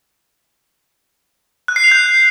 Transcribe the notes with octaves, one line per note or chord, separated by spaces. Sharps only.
F#6
C7
F7
G6